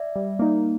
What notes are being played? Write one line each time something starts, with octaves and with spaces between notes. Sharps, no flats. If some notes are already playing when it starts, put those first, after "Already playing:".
Already playing: D5 E5
G3
A#3 D#4